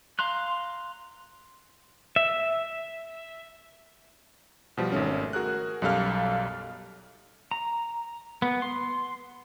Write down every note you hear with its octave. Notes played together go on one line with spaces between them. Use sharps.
F5 A#5 C6 F#6
E5
B2 F3 G3
G#1 D#3 A3 C#4
F#4 G#4 A#4 F#6
B1 F#2 G3 A4 F5 F6
A#5
B3
C6